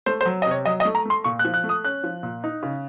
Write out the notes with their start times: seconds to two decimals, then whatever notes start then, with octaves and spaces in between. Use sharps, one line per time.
0.06 A3 C5
0.21 C5
0.25 F#3
0.42 D#5
0.46 C3 C#5
0.65 F#3 D#5
0.80 D#5
0.85 A3
0.95 A#5
1.05 A3 C6
1.24 A#2 C#6
1.39 F#6
1.45 F3
1.54 F#6
1.64 A3
1.69 D#6
1.85 C#4 F#6
2.04 F3
2.23 A#2
2.44 D#4
2.63 C#3